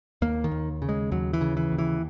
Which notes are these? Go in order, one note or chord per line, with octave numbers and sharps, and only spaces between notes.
D#2 A#3
D#3
D#2
C#3
G#3
D#2 F#3
E3
C#3
E3
D#2
E3